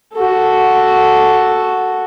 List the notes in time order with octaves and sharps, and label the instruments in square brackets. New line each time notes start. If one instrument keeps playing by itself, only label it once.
[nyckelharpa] F#4 A4